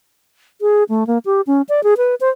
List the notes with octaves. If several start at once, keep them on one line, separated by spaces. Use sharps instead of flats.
G#4
A3
A#3
G4
C#4
D5
G#4
B4
C5